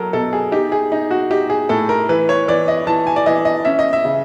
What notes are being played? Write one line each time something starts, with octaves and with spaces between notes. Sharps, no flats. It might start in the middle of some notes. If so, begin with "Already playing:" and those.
Already playing: F#3 A4 A#4
B2 A4
G#4
D#4 G4
G#4
D#4
F#4
D#4 G4
G#4
A2 A4
A#4
E3 B4
C#5
E3 D5
D#5
E3 A5
G#5
D5
E3 D#5
D#5
C#4 E5
D#5
E5
C#3